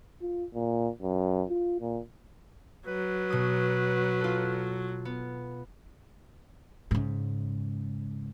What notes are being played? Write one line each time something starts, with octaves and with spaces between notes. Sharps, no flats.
F4
A#2
F#2
F4
A#2
F#3 B4
B2 D#6
F4 A4
B3
G#2 C#3